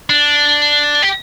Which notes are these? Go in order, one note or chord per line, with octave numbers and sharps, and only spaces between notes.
D4
G4